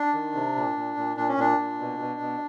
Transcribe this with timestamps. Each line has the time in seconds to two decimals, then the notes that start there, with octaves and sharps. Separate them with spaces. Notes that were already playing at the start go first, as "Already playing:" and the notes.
Already playing: D4
0.14 D#3
0.34 C3
0.56 A#2
0.76 A#2
0.96 A#2
1.17 A#2 D4
1.29 C#4
1.37 A#2 D4
1.58 A#2
1.80 B2
1.99 B2
2.20 B2